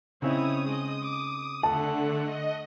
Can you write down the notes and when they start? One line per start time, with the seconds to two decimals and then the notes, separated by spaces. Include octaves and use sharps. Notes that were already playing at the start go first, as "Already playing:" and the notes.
0.22 C#3 C4 D#4 E4 C#5 D#6
0.66 G#3 D#5
1.03 D6
1.63 D3 A3 F#5 A5
2.21 D#5